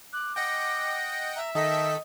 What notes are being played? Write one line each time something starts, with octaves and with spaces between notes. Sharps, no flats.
D6 F#6
D#5 F#5 G5 A#6
E5 A#5
D#3 A4 D#5 G5 B6